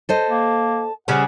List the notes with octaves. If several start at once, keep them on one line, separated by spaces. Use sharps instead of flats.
A4 C5 D#5 A5
A#3
C#3 G3 C#4 F#5